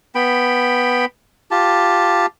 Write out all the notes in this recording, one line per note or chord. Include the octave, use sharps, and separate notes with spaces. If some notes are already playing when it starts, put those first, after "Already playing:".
B3 G5 B5
F4 G4 A5